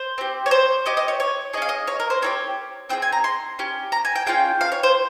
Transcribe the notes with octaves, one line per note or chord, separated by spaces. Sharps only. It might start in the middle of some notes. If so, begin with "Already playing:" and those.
Already playing: C5
C4 G4
C#5
C5
C#4 G4 D#5
D#5
C#5
C#5
C#4 G#4 D#5 F5
D#5
C#5
A#4
C5
C4 D#4 G4 C#5
C4 F4 G#4 G5
G#5
A#5
C6
C#4 G4
A#5
G#5
G5
C#4 F4 G#4 G5
F5
C#5
C5